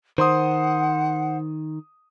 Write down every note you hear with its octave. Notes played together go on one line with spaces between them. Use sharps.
D#3 C5 F#5 C6 D#6